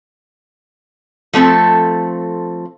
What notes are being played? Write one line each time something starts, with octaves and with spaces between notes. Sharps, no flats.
F3 A3 C4 A4